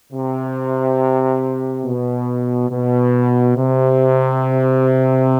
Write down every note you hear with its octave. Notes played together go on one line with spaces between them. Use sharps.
C3
B2
B2
C3